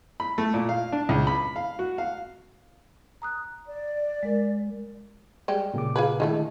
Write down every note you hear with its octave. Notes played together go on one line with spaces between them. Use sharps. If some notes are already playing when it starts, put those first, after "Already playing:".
B5
A3
A#2
F5
D4
C#2
B5
F5
F#4
F5
A#5 D#6 F#6
D5
G#3 A#4
G3 G#3 G4
A#2 C#3 D6
F4 G#4 B4
D3 D#3 G#3 A3 E4 G#4